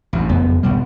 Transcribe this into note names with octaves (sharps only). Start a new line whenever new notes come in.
A1 F#2
F#1 F2 B3
G#1 B2 G3